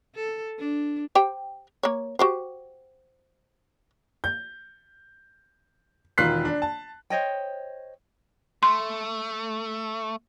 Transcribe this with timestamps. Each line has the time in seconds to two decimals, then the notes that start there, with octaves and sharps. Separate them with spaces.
0.15 A4
0.59 D4
1.15 G4 C5 G5
1.83 A#3 C#5
2.19 F#4 G4 C5
4.24 G6
6.18 E1 D#3 F4 F#6 B6 C7
6.45 D4
6.62 A5
7.10 C5 C#5 D#5 G5
8.63 A3 C6